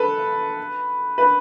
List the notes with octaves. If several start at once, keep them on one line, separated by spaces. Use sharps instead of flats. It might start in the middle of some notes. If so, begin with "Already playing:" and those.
Already playing: A4 B4
B4